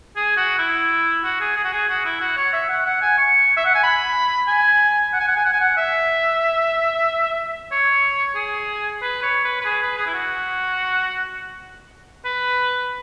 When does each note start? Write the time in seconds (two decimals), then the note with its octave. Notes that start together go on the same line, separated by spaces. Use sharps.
0.16 G#4
0.37 F#4
0.58 E4
1.24 F#4
1.40 G#4
1.56 G#4
1.64 F#4
1.73 G#4
1.89 F#4
2.05 E4
2.20 F#4
2.37 C#5
2.53 E5
2.69 F#5
2.86 F#5
3.02 G#5
3.18 C#6
3.57 E5
3.65 F#5
3.75 G#5
3.83 B5
4.47 G#5
5.13 F#5
5.20 G#5
5.28 F#5
5.36 G#5
5.45 F#5
5.53 G#5
5.60 F#5
5.77 E5
7.72 C#5
8.35 G#4
9.01 B4
9.23 C#5
9.45 B4
9.61 B4
9.65 G#4
9.82 B4
9.98 G#4
10.07 E4
10.14 F#4
12.25 B4